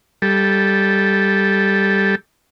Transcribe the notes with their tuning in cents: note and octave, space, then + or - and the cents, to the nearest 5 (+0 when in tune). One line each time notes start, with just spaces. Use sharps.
G3 +0 A4 -10